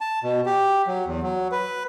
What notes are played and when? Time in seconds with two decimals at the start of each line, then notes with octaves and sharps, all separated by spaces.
0.01 A5
0.24 B2
0.46 G4
0.87 F#3
1.06 E2
1.23 F#3
1.52 B4